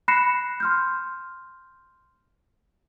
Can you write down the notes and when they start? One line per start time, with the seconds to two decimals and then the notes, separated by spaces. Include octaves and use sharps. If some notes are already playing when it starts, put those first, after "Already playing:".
0.08 B5 F#6 A#6 C7 C#7 E7
0.60 C6 F6 G6